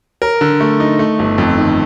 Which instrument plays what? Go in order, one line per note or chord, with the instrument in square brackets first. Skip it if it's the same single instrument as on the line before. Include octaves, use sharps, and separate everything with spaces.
[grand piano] A#4
D3
A3
D#4
A3
G1
F2
D#3